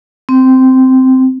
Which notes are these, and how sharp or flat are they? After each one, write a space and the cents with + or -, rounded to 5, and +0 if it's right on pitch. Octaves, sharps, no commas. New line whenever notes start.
C4 -10